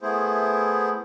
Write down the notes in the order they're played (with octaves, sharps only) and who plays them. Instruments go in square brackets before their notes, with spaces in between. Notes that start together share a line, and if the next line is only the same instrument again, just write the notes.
[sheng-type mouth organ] A3 B3 E4 G#4 C5